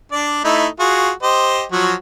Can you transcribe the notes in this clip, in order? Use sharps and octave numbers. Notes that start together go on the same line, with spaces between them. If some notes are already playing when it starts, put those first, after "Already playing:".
D4 D5
A3 D#4 E4
F4 F#4 G#4
G4 C5 D#5
F3 F#3 F#4